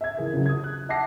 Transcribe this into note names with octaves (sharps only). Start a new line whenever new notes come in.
E5 G#6
E3 G#4 A#4
C#3 F#3
D#6 G#6
F#6
E5 F#5 A5 D6 A#6 C7